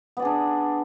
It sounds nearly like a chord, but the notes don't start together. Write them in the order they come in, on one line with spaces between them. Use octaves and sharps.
B3 D5 G#4 D4